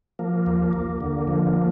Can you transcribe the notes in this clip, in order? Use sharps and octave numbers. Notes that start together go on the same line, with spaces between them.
F3 A#3
D#2
D#2
D3
F3